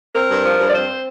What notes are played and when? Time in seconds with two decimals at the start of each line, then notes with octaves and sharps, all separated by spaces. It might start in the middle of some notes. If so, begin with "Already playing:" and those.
0.14 C4 A#4
0.28 G2
0.44 F3
0.59 G2
0.68 D5
0.74 C4 C5